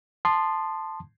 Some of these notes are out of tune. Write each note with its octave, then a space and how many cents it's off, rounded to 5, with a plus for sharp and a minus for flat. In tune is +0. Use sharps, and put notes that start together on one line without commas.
A5 +0 C6 +0 D#6 -35